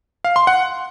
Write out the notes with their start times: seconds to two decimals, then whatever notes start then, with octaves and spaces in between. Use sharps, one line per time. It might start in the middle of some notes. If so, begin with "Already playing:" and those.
0.24 F5
0.36 C6
0.47 F#5